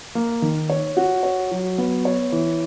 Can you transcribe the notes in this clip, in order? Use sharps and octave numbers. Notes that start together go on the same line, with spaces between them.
A#3
D#3
C#5
F#4
C#5
F#3
B3
C#5
E3